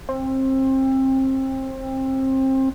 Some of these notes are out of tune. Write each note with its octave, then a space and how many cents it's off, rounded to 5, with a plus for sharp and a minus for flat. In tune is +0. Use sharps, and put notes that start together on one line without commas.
C4 +25